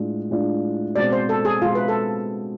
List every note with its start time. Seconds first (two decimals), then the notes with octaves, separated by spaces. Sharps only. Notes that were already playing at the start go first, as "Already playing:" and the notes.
Already playing: A2 G#3 D4 F4
0.31 A2 G#3 D4 F4
0.96 B2 G#3 C4 D5
1.12 C5
1.29 A4
1.45 G#4
1.62 B2 G#3 C4 F4
1.75 B4
1.88 A4